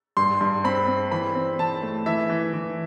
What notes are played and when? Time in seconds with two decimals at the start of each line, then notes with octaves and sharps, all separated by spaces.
0.17 G2 C6
0.41 G2
0.64 C4 B5
0.87 C4
1.12 E3 B5
1.35 C4
1.58 E3 A5
1.83 A3
2.06 E3 E5
2.29 E3
2.54 E3